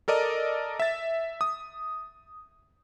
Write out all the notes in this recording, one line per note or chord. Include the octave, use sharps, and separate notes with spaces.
A4 A#4 D5 D#5
E5 A6
D#6